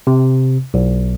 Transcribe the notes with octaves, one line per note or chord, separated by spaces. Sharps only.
C3
B1